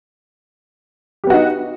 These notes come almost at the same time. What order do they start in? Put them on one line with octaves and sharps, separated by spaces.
G4 B3 F#4 D#4